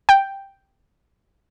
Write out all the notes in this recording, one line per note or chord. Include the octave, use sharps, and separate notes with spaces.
G5